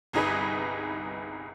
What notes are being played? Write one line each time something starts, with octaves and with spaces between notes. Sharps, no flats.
G1 C2 D#4 G#4 B4